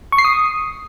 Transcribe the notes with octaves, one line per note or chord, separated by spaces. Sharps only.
C#6
C7
D#6